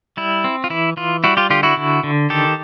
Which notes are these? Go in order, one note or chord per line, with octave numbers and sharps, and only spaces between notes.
G3 E4
C4
F4
E3 E4
E3 F4
G3 E4 F#4
F4 G4
D3 F4 G4
E4 F#4
D3
D3
D#3 G4 A4